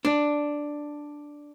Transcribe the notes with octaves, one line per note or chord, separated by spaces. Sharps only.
D4